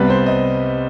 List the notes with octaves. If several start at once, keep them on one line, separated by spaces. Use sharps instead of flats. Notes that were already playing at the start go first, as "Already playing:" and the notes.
Already playing: C2 C3 G3 B3 B4
C5
D#5